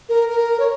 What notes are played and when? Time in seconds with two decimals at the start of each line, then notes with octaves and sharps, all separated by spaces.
0.09 A#4
0.29 A#4
0.60 C#5